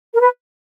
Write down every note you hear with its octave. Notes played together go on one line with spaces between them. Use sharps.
A#4
B4